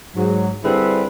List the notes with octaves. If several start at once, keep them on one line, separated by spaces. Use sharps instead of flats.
G#2 F#3
D3 G3 C4 E4 G#4 B4